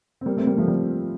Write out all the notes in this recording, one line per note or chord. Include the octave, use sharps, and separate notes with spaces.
C4
G3 A#3
A3 C4
G3 A#3
F3 A3
G3